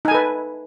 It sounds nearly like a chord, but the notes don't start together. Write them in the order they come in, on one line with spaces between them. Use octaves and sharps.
D#4 G#5 A4 B4